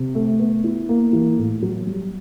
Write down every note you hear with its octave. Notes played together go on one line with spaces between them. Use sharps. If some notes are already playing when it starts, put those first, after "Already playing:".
Already playing: C3
A3
B3
E4
A#3
E3
A2
F#3
G3